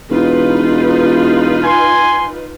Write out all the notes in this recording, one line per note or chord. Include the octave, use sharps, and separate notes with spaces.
E1 D#4 F4 B4
G#5 C6